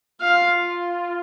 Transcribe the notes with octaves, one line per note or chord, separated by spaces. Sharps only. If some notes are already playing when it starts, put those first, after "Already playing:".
F4 F5